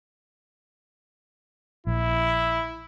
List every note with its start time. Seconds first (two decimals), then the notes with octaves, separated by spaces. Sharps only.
1.87 A#1 E4